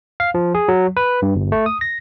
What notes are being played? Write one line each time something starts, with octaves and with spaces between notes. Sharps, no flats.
F5
F3
G#4
F#3
B4
G2
G1
A3
D#6
A#6